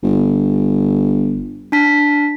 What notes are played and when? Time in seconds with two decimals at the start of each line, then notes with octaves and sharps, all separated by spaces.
0.03 G1
1.72 D4 A5 B6